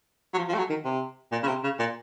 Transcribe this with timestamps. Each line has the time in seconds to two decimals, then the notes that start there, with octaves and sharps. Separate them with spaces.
0.34 F#3
0.38 F3
0.48 F3
0.54 A3
0.58 F#3
0.69 D#3
0.85 C3
1.32 A#2
1.43 C#3
1.48 C3
1.64 C#3
1.79 A#2